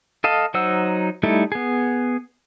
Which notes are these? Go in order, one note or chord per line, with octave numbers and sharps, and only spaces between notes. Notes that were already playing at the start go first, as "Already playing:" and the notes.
A4 D#5 F5 A5
F#3 D#4 C5 F#5 E6
G3 A3 D#4 E4 A4
B3 G#4